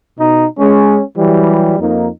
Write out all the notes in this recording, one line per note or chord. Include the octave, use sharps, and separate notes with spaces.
B2 D#4
G#3 C#4
E3 F#3 G3
F2 A#3 D#4